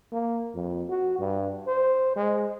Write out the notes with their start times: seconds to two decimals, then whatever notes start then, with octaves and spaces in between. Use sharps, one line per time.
0.12 A#3
0.55 F2
0.89 F#4
1.19 G2
1.67 C5
2.16 G#3